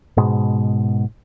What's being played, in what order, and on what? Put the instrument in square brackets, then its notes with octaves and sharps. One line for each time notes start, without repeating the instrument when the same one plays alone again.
[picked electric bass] G#2 B2 G#3